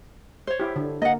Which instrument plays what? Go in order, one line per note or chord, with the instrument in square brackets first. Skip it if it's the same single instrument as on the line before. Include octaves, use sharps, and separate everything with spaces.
[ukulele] C5 C#5
[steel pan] E4 G4
D3
[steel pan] A#3 [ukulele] D#5 F#5